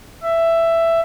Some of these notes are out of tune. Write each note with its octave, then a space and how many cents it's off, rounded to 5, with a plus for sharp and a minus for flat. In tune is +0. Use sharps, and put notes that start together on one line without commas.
E5 +10